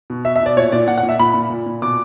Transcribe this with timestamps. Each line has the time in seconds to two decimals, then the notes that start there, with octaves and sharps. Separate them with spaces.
0.10 B2
0.25 B2 E5
0.36 E5
0.40 B2
0.46 D5
0.56 A#2 C#5
0.72 A#2 D5
0.87 A#2 F#5
0.98 F#5
1.03 A#2
1.09 E5
1.19 A#2 B5
1.34 A#2
1.50 A#2
1.66 A#2
1.82 B2 D6